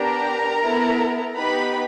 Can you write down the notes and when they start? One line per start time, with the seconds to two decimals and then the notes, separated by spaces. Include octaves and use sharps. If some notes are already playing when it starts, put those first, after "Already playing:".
Already playing: B3 D4 G4 A#4 A#5
0.62 B3 E4 A4
1.37 B3 D#4 G4 B4 B5